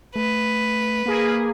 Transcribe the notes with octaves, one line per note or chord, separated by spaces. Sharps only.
A3 B4
A#3 G#4